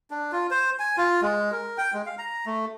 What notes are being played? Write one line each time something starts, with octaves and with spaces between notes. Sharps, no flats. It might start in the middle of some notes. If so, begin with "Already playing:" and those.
D4
F4
C5
G#5
F4
G#3
A#4
G5
G#3
F5
A#5
A3